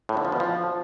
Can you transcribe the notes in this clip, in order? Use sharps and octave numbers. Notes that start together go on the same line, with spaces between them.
A2
D3
F3
B2
F3